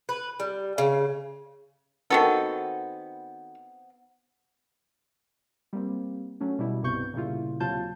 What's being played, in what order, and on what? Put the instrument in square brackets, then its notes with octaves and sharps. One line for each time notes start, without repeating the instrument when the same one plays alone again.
[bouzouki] B4
G3
C#3
[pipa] D#3 F#4 A4 [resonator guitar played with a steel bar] B3 C4
[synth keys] G3 A#3 C4
F#3 A3 C#4
B2 G3 E4
C2 G2 C3 B3 C#6 G6
A#2 C#3 G3 E4 F4
D#2 C3 F#3 F4 A5 G6